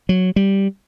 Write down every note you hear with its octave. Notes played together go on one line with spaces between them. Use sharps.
F#3
G3